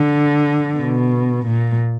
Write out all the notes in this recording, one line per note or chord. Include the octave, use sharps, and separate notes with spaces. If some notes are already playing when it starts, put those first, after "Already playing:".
Already playing: D3
B2
A#2